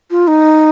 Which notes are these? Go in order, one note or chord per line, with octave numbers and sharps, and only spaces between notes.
F4
D#4